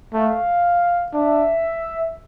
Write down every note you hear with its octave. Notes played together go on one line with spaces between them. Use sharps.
A3 F5
D4 E5